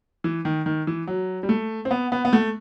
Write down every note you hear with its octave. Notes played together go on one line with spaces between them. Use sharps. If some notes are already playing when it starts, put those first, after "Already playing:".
E3
D#3
D#3
E3
F#3
G3
A3
C4
B3
B3
B3
A3